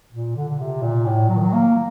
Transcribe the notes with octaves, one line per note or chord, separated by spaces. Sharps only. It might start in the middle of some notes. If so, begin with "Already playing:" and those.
A#2
D3
D3
C3
A#2
A2
F#3
D#3
F#3
A#3